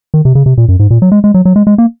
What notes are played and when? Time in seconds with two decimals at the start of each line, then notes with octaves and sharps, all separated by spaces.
0.14 D#3
0.25 C3
0.35 C#3
0.46 C3
0.58 A#2
0.69 F#2
0.80 G#2
0.91 A#2
1.02 F#3
1.12 G#3
1.24 G#3
1.34 F#3
1.45 F#3
1.56 G#3
1.67 G#3
1.78 A#3